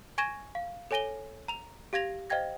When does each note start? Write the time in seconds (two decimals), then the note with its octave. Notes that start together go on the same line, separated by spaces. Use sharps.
0.18 G#5 C#6 G#6 A#6 D#7 E7
0.55 F5
0.91 A4 C#5 G#5 A#6 D#7 G7
1.48 A#5 F7
1.93 G4 F5 G#6 A#6 F7
2.30 C5 D#5 F5 G5 G#6 A#6